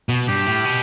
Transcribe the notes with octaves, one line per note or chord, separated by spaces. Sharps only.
B2
G2 G4
A2
B2